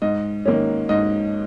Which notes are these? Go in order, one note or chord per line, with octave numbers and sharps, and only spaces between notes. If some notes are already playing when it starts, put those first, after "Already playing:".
G#2 D#5
D#3 A#3 C#4
G#2 D#5